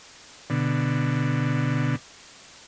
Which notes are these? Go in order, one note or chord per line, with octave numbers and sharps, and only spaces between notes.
B2 D3